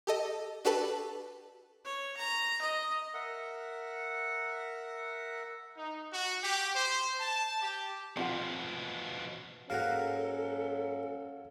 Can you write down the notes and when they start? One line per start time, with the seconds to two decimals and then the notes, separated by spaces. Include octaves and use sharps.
0.07 G4 A4 D#5
0.65 D4 F#4 G4 A4 B4 A5
1.85 C#5
2.17 A#5
2.62 D#5
3.14 A#4 E5 F#5
5.77 D#4
6.12 F#4
6.42 G4
6.74 C5
7.19 A5
7.61 G4
8.17 B2 F3 C4 F4 F#5
9.70 G#2 F#3 A#3 C#4 A4 F5 F#5